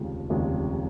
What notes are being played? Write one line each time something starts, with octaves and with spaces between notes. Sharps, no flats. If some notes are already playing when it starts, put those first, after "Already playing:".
Already playing: F1 D#2 C#3 F3 G#3
F1 D#2 C#3 F3 G#3